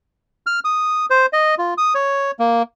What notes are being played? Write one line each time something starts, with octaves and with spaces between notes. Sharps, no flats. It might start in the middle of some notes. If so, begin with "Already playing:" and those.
F6
D#6
C5
D#5
F4
D#6
C#5
A#3